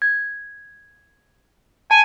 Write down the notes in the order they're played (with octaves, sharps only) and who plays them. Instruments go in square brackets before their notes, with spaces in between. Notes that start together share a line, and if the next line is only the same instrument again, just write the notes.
[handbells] G#6
[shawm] G#5 [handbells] A5